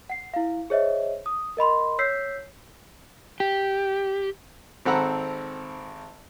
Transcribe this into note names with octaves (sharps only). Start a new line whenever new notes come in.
F#5 C7
E4 F5
G#4 C5 C#5 D#5 E5
D#6
A#4 D#5 B5 C6
C#5 E6 G6 B6 C7
G4
G#1 C4 A4 F#5 A#5 B5